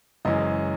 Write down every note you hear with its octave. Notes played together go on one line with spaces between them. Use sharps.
F#1 F#2 E3 G#3 C#4 D#5